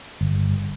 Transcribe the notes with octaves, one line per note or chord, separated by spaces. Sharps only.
G1